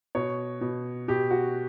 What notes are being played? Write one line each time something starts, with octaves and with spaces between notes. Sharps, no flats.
B2 C#5
B2
B2 G4
F#4